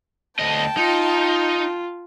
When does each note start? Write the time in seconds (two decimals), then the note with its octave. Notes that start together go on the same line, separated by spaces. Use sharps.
0.39 D2 D#5 G5 A5
0.77 D#4 F4